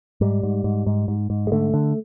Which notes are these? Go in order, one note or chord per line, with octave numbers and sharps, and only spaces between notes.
G#2 G3
G#2
G#2
G#2
G#2
G#2
G#3
D3 A3
D3